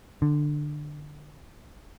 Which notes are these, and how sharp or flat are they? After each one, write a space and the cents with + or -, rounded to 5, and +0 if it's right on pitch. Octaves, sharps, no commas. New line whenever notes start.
D3 +15